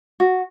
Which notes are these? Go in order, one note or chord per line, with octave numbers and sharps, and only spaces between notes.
F#4